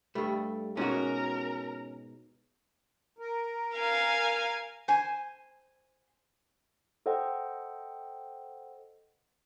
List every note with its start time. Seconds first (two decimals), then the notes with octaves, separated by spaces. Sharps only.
0.15 G2 G3 A3
0.77 G#2 B2 C#4 F#4 A#4
3.19 A#4
3.76 F5 G#5
4.88 C5 G#5
7.06 A4 C5 D#5 F#5 G5